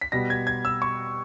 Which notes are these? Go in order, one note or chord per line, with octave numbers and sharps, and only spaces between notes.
B6
B2 G3 B3 A#6
G#6
G#6
E6
C#6